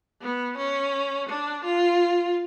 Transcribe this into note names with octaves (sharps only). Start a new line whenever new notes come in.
B3
C#4
D4
F4